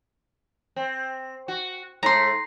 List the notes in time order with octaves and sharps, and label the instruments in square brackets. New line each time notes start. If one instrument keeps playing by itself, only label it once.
[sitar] C4
F#4
[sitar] G#2 A3 [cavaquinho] A#5 C6